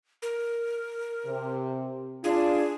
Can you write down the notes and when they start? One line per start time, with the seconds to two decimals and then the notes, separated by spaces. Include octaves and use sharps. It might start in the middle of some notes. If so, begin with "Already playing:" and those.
0.22 A#4
1.26 C3
2.24 D4 F4 G#4